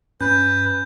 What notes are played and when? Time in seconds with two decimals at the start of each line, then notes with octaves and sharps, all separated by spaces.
0.21 G2 C#4 B4 G6